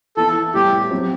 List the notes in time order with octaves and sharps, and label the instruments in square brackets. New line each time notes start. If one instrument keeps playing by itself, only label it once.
[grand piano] E3 B3 E4 [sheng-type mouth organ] A4
[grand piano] A2 G3 B3 [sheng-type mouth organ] G4
[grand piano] F#3 C4 G4